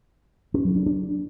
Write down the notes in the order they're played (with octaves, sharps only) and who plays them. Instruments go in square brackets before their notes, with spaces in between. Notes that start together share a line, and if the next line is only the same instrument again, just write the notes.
[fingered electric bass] C#4
F#3
D4
D4